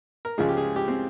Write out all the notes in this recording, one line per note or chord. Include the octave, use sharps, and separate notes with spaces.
A#4
C#2 C#3 F3 G#3 G#4
G4
G#4
G4
C4